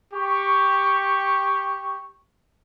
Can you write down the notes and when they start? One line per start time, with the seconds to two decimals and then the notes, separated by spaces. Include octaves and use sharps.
0.14 G4 C#6